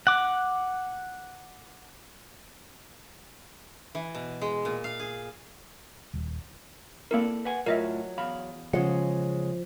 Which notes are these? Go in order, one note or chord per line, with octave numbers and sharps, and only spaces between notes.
F#5 D6
E3
B2
G#3
A#2
F5
G#4
D#1
A#3 C4 E4 A4 A#4 D5
B4 F#5 G#5
A2 F#3 F4 A#4 D#5 E5
E2 F5 B5
C#3 F3 G#3 F#5